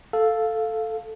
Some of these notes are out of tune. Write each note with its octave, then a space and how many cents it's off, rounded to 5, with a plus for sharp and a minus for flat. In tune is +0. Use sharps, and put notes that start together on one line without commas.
A4 +0 F5 +0